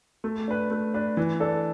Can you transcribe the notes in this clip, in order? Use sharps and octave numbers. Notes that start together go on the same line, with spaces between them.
A3
D4 B4
A3
D4 B4
E3
D4 A4 D5